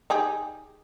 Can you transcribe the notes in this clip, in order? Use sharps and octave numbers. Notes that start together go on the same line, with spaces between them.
D#4 G4 G#4